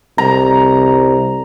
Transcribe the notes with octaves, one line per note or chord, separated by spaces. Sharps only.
C2 A#5